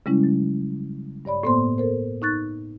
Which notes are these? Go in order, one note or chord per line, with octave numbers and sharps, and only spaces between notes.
C#3 G3 G#3 C#4 E4
F#3
G2 C#5 D5 B5
A2 A#3 B3 C5 C6
A4 A#4 C5
D#4 C#6 F#6 A6